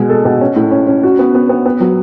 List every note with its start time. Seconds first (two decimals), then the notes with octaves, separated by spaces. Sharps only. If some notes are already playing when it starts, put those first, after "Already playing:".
Already playing: B2 G#3
0.09 A4
0.25 B2
0.41 C#4
0.56 A2
0.71 C#4
0.87 C#4
1.03 F#4
1.19 B3
1.35 B3
1.49 B3
1.65 B3
1.80 F#3